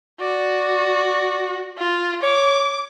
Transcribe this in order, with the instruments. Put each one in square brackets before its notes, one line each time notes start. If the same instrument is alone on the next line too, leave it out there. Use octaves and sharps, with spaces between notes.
[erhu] F#4 [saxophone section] D5
[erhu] F4
[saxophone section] C#5 [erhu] D6